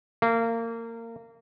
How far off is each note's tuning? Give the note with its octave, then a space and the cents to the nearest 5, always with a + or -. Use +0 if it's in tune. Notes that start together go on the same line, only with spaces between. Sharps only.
A#3 -25